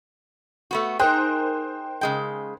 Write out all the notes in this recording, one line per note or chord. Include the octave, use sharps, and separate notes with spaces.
A3 B3 F#4
D#4 G#4 A#4 C5 G5 F#6
C#3 G#3 G5